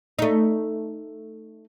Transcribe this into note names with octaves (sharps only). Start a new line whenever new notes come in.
A3 D#4